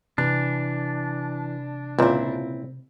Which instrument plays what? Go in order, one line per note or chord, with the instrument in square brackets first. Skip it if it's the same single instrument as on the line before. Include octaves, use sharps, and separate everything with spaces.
[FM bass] C3 [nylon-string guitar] E3 [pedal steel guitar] D4
[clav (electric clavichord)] C#2 A#2 [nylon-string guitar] C4 E4